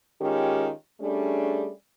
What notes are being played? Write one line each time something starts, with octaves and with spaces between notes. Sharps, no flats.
D#3 G#3 C#4 F4 G4
G3 A3 C#4 D4 G#4